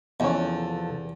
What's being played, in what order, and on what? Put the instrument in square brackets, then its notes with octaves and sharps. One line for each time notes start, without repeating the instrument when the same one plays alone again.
[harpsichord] E2 [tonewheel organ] C3 F3 A4 [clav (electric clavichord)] G#3 C#4